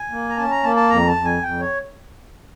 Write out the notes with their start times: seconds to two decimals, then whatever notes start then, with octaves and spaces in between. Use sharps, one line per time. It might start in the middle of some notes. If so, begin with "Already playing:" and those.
Already playing: G#5
0.11 A#3
0.29 A#5
0.37 C#4 A5
0.51 A#5
0.63 A#3 A5
0.76 A5
0.89 F2 A#5
1.07 A5
1.16 F2
1.25 G#5
1.42 F2 G5
1.60 C#5